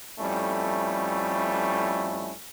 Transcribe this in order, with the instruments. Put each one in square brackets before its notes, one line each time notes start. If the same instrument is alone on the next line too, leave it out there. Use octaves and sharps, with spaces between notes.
[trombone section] F2 G3 A3 C#4 E4